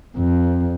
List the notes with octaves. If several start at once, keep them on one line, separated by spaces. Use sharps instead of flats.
F2